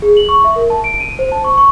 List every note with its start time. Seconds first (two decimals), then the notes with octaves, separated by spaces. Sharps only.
0.02 G#4
0.17 F#7
0.29 C#6
0.44 E5
0.56 A#4
0.70 A5
0.84 D7
1.00 D#7
1.19 C5
1.32 A5
1.44 C#6
1.58 C#6